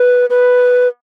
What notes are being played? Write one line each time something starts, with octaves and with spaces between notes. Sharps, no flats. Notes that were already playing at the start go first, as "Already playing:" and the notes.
Already playing: B4
B4